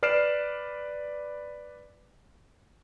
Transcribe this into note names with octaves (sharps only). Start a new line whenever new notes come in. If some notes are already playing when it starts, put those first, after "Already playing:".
B4 D5 F6 C7 D7 E7